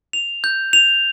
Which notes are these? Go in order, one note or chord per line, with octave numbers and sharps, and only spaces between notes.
F7
G6
F7